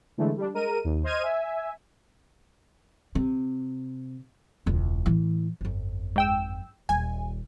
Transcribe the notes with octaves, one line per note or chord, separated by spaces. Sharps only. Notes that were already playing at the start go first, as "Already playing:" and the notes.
D3 E3 G#3 A3
G3 D4
G#3 A#4 D#7
D#2
C5 D#5 F6 G#6 D#7
E5 G#5
C3
E1 C#2
A2 E3
G1 F2
G#2 G5 E6
D#1 G3 G#5